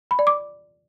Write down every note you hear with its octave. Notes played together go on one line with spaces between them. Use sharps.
B5
D5
D6